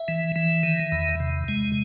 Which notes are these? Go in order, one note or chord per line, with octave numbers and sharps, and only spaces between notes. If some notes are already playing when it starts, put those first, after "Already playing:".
Already playing: E5
E3
E3
D#3
E2
C3
G#3